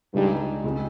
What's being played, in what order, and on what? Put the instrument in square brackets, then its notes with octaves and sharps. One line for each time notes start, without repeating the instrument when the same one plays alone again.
[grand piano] C#2 C#3 G#3 D#4 [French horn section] G2
[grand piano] C#2 C#3 G#3 C4